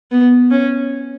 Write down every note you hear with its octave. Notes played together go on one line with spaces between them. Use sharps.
B3
C#4